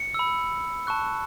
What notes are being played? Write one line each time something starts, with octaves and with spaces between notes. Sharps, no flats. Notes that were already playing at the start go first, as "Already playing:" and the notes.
Already playing: C#7
B5 E6
A5 C#6 F#6